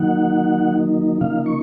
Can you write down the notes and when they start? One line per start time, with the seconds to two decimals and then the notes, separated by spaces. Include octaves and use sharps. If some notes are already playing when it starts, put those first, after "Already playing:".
Already playing: D#3 F#3 A#3 D#4 F#5
1.21 C#3 F3 A#3 D#4 F5
1.46 C#6